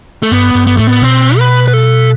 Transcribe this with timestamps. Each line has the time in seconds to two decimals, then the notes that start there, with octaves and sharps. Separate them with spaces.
0.23 A3
0.31 G2 B3
0.55 G2
0.67 B3
0.77 A2 A3
0.87 B3
1.02 B2 C4
1.38 B4
1.68 B4
1.73 A4